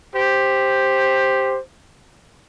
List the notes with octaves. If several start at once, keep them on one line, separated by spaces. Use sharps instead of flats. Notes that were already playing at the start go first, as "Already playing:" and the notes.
G4 C5